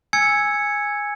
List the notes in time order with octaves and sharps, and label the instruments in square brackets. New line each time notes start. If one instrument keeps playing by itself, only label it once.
[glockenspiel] G#5 E6 G#6 C#7